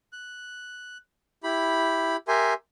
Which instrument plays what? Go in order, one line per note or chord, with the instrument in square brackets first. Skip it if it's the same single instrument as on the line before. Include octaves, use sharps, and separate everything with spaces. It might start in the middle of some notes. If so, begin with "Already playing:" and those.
[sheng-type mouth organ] F#6
E4 G4 B5
G4 A#4 E5 G#5 C6